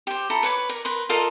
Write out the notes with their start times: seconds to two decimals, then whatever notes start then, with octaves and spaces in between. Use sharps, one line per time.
0.07 G4 C5
0.30 E4 A4 A#5
0.43 B4 C#5 D6
0.69 A#4
0.85 A#4 B4 C6
1.09 F4 A4 A#4 D#5